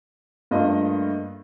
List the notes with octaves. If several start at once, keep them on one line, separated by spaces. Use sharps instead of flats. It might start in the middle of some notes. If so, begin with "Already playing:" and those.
G2 A3 A#3 F4 D#5